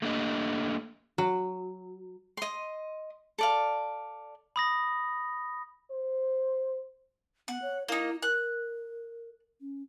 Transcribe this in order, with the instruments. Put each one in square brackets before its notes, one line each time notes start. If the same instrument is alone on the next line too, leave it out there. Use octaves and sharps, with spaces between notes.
[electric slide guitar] A3 A#3 D4 G4 D#5
[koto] F#3
[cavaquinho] D#5 C6
A4 D5 F5
[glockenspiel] B5 D#6 A#6
[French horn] C5
[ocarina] B3 [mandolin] F#5
[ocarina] C#5
[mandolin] A#3 D#4 [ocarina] E4
[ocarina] A#4 [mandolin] F#6
[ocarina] C#4